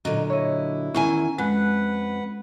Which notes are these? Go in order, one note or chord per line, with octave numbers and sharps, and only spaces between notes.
A#2 D3 F#3 D#5
E4 C#5 D#5
E2 D#3 C#4 G#5
F2 G#3 B4 F#5